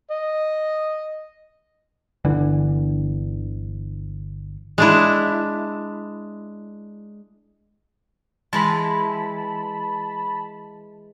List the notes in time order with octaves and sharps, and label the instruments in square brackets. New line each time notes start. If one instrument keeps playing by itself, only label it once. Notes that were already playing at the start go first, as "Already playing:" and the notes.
[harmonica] D#5
[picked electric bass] G1 D3 E3
[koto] G#3 D4 E4
[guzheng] E3 G#3 [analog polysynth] A5 B5